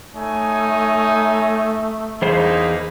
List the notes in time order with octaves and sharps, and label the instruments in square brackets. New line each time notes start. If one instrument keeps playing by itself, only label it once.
[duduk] A3 [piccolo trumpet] D#4 [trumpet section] C#5 G#5
[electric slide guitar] E2 G#4 C5 [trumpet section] A#3 D#4 [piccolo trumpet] B5